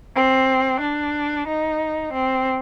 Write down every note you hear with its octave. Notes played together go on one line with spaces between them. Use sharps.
C4
D4
D#4
C4